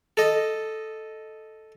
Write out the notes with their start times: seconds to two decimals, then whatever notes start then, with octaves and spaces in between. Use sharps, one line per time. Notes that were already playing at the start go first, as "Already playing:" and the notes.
0.17 A4 D#5